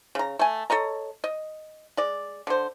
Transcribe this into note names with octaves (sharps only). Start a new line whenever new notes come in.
C#3 A#5
A3 G#5
A4 C#5 D#5 A#5
D#5
G#3 D5
D3 C5